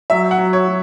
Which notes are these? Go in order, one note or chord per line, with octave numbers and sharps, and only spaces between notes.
F#3 E5
F#5
F#3
C#5
F#3